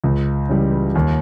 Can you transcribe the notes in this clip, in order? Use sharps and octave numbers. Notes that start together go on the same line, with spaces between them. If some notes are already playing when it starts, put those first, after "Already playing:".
C#2
C#3 E3 G3
D#2